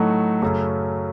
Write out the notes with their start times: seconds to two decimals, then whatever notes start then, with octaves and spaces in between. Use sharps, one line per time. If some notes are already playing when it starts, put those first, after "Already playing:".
Already playing: A2 F#3 A3 D#4 F#4
0.42 F#2 C#3 F#3 A3 C#4